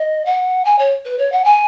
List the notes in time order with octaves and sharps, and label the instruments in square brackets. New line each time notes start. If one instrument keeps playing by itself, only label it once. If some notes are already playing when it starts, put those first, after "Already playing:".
Already playing: [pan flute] D#5
F#5
G#5
C#5
B4
C#5
F#5
G#5